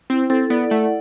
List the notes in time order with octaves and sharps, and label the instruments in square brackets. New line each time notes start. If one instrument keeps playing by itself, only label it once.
[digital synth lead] C4 [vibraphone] E4
[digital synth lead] C4 [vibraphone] A4
[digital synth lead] B3 [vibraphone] D5
[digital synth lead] A3 [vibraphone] F#5